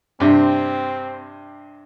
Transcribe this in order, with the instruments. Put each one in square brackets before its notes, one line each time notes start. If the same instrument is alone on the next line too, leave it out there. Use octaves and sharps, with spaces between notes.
[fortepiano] G2 C3 [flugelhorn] C4